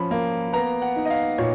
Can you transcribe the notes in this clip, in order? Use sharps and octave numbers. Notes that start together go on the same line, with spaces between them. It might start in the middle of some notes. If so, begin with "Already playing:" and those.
Already playing: F3 C#4 B5
A#3
B3 A#5
F#5
D#4
D#5
F5
A#2 C#5